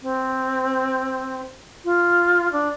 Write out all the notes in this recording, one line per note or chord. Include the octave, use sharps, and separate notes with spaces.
C4
F4
D4